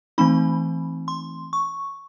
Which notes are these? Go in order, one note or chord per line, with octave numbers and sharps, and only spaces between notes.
E3 A3 C4 D#4 B5
C6
C#6